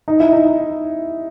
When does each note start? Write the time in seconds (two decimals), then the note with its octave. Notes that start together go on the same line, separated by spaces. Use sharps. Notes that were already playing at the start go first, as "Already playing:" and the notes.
0.08 D#4
0.20 E4
0.33 D#4